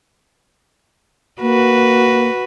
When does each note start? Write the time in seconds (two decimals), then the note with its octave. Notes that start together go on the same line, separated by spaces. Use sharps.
1.41 A#3 F#4 B4